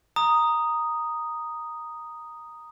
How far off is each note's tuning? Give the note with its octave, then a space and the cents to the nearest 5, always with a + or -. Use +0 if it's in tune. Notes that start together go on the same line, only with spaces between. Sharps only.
A#5 +0 D#6 +0